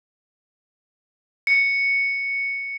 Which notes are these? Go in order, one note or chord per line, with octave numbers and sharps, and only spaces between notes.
C#7